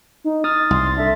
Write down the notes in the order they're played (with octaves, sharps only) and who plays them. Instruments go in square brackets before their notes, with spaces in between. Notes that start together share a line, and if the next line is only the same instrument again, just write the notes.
[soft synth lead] D#4
[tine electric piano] D#6 F6 [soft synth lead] A6
[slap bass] C2 [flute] C6
[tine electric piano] D4 A4 [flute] E5